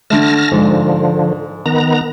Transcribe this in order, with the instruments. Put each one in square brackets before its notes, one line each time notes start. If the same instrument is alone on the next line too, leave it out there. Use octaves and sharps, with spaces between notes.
[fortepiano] D3 A3 [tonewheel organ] A5 F6 A#6
[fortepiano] G#2 [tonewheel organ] D3 F3
[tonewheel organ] D#3 B3 A#5